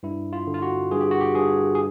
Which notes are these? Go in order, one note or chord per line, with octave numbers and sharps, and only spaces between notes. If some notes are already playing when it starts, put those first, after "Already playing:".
G2 E4
F4
D3
F4
F#4
G2 G#4
G4
F#4
G4
G2 G#4
G#4